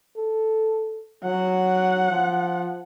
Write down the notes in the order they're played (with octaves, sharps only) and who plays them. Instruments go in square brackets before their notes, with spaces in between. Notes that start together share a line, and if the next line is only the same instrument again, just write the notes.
[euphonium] A4
[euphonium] F#3 [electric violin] F#5
[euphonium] F3